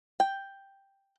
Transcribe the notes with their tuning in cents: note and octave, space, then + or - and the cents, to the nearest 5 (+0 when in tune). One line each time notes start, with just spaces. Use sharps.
G5 +5